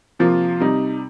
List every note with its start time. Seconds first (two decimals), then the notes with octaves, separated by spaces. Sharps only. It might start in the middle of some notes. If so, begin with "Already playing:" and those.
0.19 C3 F3 A#3 F4
0.60 C3 G3 D#4